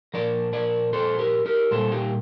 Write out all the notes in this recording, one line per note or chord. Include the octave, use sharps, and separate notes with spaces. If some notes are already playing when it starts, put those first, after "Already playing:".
A#2 F3 A#4 D5
A#4 D5
A4 C5
G4 A#4
G4 A#4
A#2 G3 A4 C5
D#4 G4